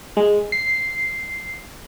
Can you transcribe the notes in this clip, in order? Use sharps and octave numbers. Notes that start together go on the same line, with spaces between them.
G#3
C7